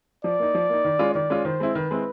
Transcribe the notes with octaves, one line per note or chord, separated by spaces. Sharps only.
F3 D5
A#3 D#4
F3
A#3 D#4
D#3
G#3 C#4 F4
D#3 D5
G#3 C#4 F4
D#3 C5
G#3 C4 E4
D#3 B4
G#3 C4 E4